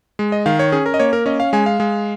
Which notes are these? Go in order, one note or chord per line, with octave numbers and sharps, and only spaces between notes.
G#3
D#5
D#3 F5
C#5
C#4 G#4
A#4
D#5
A#3 C#5
A#4
C#4 D#5
F5
G#3 G#5
F5
G#3